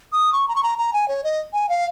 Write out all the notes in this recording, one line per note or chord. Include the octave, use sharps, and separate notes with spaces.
D#6
C#6
A#5
C#6
A#5
A#5
G#5
C#5
D#5
G#5
F5